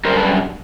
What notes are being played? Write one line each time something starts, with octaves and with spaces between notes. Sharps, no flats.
F#2 D3 G3 A#4 C5
A4 B4